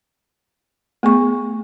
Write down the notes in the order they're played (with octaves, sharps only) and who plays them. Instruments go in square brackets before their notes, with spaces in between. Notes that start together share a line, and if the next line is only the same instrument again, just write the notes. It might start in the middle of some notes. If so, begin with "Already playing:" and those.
[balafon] A3 B3 G#4 C#6